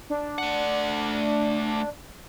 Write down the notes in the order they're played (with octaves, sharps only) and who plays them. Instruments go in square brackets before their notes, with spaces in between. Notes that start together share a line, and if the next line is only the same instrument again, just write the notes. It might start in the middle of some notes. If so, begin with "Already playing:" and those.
[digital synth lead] D4
[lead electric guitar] A3 F#5